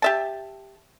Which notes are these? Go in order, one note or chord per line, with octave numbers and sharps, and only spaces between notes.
G4 E5 A5